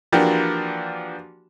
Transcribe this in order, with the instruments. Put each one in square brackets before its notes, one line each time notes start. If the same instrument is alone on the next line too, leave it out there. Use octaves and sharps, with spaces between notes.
[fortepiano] E3 F3 A#3 D4 F#4 G4